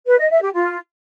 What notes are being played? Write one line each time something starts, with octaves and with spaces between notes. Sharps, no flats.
B4
D#5
E5
G4
F4